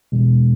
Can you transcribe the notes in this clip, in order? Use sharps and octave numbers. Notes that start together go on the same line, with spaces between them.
E1